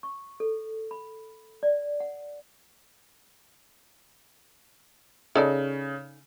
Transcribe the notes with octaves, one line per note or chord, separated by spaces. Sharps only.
C#6
A4
B5
D5
F#5
C#3 D#4 A4 D5